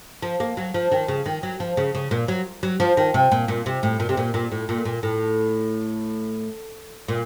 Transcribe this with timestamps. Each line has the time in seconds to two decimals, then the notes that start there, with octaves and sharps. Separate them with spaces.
0.22 F3
0.40 A#3
0.57 F#3
0.74 F3
0.92 D#3
1.08 C#3
1.26 D#3
1.43 F#3
1.60 F3
1.77 C#3
1.95 C#3
2.11 A#2
2.28 F#3
2.63 F#3
2.80 F3
2.97 D#3
3.14 C3
3.32 A#2
3.48 A#2
3.66 C3
3.83 A2
4.00 A#2
4.09 C3
4.17 A#2
4.34 A#2
4.52 A2
4.69 A#2
4.85 A#2
5.03 A2
7.08 A#2